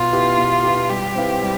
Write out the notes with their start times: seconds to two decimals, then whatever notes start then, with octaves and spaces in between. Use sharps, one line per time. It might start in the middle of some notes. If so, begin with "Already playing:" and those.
Already playing: B2 F4
0.12 B3 E4 G4
0.38 B2
0.64 B3 E4 G4
0.90 G3 G4
1.15 C4 E4 B4 F5
1.42 G3